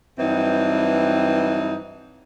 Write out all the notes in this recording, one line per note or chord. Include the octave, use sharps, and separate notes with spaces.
G2 E3 F#3 C4 D#4